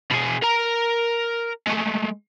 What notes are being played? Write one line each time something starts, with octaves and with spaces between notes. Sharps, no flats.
B2 G#4
A#4 A#5
G#3 A3